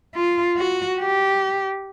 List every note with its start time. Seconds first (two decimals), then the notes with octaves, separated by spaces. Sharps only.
0.15 F4
0.57 F#4
1.00 G4